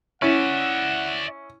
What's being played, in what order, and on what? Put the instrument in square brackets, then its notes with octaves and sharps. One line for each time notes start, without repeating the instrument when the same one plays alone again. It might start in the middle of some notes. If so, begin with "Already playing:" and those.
[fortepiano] C#4 [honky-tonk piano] E4 [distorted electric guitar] D5 E5 [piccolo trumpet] F#5